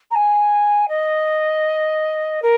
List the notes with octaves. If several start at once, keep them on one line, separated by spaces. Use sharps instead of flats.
A#5
G#5
D#5
A#4